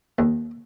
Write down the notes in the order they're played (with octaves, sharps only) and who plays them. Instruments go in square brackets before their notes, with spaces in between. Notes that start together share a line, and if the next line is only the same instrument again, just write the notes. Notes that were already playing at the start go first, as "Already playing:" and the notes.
[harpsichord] D#2